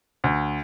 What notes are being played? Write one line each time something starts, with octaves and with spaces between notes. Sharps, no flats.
D2